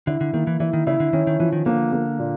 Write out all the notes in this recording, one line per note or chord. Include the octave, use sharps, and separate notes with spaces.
D3 E4
D3
D#3 A#3
E3
E3 E4
D#3
C#3 E4
D3
D#3 C#4
D#3
E3 F3
D#3
D3 A#3
A#3
A#2